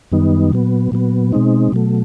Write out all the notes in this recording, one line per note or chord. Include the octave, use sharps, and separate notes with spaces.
F#2 D#3 G3 B3 D#4
A#2 F#3 B3
A#2 F#3 B3
B2 G#3 C4 D#4
B2 F#3 A3